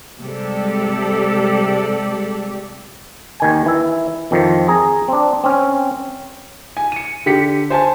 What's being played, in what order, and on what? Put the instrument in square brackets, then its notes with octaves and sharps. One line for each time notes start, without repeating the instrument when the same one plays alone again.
[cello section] C3 G3 G#3 G4 A4 D5
[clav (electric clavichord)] D#2 D#3 G#5
E3 E5
F2 D#3 F3
G#4 A#5
C4 D4
C4 C#4
[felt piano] G#5
C#7 D#7
D3 G4 B6 C#7
C5 G#5 A5 C6